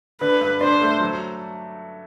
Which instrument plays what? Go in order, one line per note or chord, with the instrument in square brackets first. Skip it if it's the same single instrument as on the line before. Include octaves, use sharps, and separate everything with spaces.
[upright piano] D3 [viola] B4
[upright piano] G2
[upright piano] D4 [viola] C5
[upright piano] A3
F#3